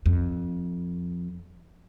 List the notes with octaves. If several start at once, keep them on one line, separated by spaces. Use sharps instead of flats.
F2